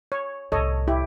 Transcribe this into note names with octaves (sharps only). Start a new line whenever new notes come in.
C#5
C2 A2 A4 C#5 D#5
E4 G4